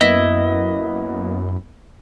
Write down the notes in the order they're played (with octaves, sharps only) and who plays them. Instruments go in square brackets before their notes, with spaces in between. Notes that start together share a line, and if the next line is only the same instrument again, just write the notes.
[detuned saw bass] F#2 [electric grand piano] A#3 B3 B4 [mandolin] E4 [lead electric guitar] D#5